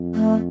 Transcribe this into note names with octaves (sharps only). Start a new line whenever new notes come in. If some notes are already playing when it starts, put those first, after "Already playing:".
Already playing: F2
A3